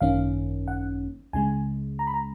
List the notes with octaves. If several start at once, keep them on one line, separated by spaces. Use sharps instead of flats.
G#1 F#2 D#3 A#3 C#4 F5
F#5
C#2 C#3 G#3 G#5
A#5
B5
A#5